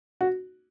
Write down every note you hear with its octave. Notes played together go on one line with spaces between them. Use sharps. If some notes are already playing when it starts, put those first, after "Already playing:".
F#4